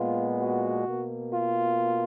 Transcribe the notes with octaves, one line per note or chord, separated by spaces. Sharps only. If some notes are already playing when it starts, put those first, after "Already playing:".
Already playing: A#2 G#3 B3 F4
F#4
B2 A#3
F4